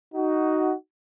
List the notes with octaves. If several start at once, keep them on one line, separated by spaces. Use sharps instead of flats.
D#4 F#4